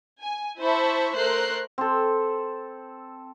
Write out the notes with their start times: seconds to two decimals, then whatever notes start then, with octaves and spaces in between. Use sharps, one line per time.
0.23 G#5
0.60 E4 C5 E5 A5 B5 C#6
1.16 A3 A#4 C5 C6 F#6 C7
1.78 C4 A4